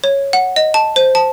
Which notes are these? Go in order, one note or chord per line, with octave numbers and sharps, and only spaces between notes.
C#5
F#5
D#5
A5
C5
A5